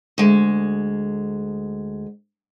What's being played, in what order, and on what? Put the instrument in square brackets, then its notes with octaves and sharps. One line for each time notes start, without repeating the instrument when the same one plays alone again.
[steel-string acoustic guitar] D2 G#3